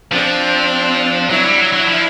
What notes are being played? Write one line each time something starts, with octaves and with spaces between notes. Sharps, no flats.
F3 C4 D4
F#3 D4 E4
G3
F#3
F#3
F3